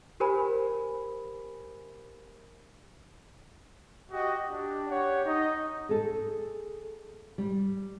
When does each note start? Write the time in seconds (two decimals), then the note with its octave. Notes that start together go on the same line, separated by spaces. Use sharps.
0.20 G4 A#4 C5 G#5 B5
4.12 F#4 G4 D#5
4.50 D4 G4
4.89 G4 C#5 F#5
5.26 D#4 D#5
5.89 G#4 A4
7.38 G3